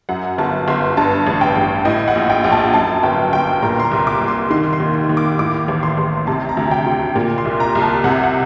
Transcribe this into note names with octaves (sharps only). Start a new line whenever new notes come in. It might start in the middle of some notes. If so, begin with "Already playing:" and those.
F#2 F#5
G1 A5
G1 C6
G2 A5
A1
G5
A1
A2 D#5
F#5
A#1
G5
A#1
A5
F#2 A5
G1 G5
G1 G5
A#2 A#5
C6
A#5
C2
D6
C2
C6
D#3 C6
C6
D#2
D#2
D6
A2 D6
A1
C6
A1
C3 A5
A#5
D2
G5
D2
A#2
C6
C2
A#5
C2
A5
C3 F#5
F#5